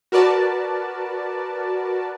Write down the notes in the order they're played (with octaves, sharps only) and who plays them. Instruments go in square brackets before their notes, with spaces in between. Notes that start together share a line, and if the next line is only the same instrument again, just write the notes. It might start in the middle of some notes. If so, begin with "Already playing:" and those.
[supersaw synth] F#4 A#4 B4 D5 A5